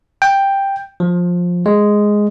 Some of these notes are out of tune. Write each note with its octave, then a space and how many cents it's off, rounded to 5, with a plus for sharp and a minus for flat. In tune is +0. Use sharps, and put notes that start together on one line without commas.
G5 +5
F3 +15
G#3 +0